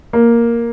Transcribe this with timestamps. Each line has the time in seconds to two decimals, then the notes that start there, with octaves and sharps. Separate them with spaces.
0.13 A#3